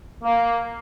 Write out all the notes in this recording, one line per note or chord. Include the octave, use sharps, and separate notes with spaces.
A#3